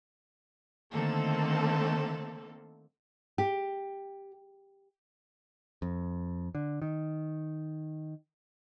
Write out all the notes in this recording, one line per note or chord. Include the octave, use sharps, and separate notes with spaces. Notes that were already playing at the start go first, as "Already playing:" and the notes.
D3 D#3 A3 A#3 C4 A4
G4
F2
D3
D#3